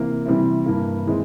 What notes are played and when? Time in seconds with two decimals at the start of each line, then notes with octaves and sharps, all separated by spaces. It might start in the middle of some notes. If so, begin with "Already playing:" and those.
Already playing: C3 E3 A#3
0.25 C3 E3 G3 C4 E4
0.66 G2 E3 A#3
1.07 E3 G#3 C4